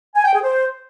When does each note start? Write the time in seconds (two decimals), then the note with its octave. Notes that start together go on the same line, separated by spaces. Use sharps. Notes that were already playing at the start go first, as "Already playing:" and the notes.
0.15 G#5
0.25 G5
0.34 G#4
0.43 C5